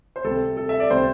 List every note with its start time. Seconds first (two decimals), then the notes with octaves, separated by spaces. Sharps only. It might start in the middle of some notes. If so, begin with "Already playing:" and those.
0.16 C5
0.24 C3 G3 A4
0.57 A4
0.69 E5
0.80 D5
0.90 C3 G3 C5